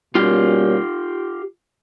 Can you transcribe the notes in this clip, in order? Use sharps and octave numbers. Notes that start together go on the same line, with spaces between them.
B2 G3 A#3 C#4 F4 G4